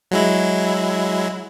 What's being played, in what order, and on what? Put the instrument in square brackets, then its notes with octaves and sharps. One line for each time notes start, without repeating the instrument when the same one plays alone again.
[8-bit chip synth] F#3 G#3 E4